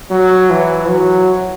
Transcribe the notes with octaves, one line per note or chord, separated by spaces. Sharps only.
F#3
E3
F#3